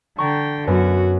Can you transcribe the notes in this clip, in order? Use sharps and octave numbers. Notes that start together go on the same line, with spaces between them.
D3 G5 A#5 C#6
F#2 B3 F#4